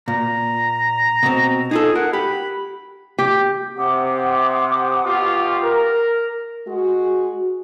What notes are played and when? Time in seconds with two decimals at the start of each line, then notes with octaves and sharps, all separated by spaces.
0.08 A#2 A#5
1.23 B2 C4
1.71 D#4 F4 G#4 A4
1.95 A#4 F#5
2.13 G4 B5
3.18 G4
3.77 C3 F#5 D6 D#6
5.04 B2 F4 G4
5.63 A#4
6.67 G#3 F#4